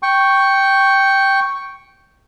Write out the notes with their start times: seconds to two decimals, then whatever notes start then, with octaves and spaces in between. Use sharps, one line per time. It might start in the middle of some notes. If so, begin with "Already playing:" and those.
0.03 G5 C#6